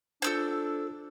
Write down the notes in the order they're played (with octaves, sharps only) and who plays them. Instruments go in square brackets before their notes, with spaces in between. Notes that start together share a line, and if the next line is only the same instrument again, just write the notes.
[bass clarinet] D4 [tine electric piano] F4 C5 [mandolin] A4 E6 G6